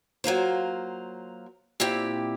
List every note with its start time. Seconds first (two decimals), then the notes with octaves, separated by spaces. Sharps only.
0.24 F#3 A#3 F4 C5
1.80 A#2 C4 E4 G4 G5